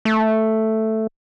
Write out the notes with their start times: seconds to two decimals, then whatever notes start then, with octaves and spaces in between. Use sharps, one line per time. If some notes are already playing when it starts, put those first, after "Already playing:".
0.05 A3